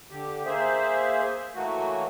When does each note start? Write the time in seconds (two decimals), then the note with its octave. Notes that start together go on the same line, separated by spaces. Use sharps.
0.11 D3 G4
0.46 A#3 G#4 C5 E5
1.55 E3 F#3 A3 A#3 F#4